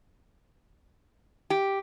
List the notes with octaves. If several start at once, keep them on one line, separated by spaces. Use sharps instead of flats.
G4